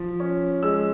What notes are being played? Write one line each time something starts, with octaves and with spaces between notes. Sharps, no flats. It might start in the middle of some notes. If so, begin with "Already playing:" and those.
Already playing: F3
C#4
G#3 E6